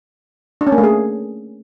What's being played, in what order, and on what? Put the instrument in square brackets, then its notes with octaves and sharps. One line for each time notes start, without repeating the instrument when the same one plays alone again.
[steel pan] D4
C#4
A#3
A3
G#4